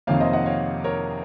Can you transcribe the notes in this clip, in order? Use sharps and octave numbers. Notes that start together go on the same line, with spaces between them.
F2 C3 D#3 A#3 C#5 F5
C5 D#5
D#5 F#5
C#5 F5
A#4 C#5